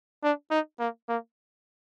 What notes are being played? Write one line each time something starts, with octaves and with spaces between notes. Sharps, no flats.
D4
D#4
A#3
A#3